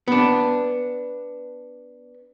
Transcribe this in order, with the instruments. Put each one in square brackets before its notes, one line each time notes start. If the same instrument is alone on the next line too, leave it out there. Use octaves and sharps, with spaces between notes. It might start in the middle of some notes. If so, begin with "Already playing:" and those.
[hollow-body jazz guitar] B3 D4